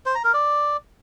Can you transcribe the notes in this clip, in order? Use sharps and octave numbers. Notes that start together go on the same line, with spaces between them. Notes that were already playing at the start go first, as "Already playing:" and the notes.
C5
A#5
A#4
D5